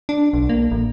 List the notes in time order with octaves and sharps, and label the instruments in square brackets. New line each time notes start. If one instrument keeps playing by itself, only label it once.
[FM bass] D4
B1
A#3
A1